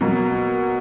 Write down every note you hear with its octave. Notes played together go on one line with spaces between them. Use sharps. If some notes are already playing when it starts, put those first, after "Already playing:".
B2 F#3 A#3